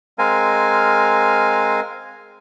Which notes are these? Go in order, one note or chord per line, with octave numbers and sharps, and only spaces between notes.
G#3 C4 A#4 F5 G#5